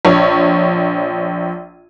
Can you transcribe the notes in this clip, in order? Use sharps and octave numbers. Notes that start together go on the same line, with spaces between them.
A#1 C#5